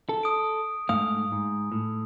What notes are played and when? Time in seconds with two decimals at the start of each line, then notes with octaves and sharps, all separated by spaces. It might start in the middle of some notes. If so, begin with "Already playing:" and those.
0.09 A4
0.23 D#6 D7
0.89 G#2 A3 F5 D#6
1.32 G#2
1.72 A2